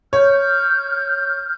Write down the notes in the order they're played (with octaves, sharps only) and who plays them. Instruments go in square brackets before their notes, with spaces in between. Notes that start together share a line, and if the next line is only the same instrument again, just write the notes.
[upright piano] C#5 [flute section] F6 G6